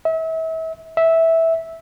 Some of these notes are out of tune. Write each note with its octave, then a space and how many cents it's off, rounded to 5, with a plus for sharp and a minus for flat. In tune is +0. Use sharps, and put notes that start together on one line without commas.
E5 -35
E5 -10